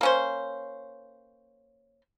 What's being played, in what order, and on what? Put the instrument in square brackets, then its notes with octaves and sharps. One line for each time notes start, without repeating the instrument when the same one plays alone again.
[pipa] A#3 C#4 C5